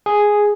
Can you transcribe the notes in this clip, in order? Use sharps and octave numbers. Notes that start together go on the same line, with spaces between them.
G#4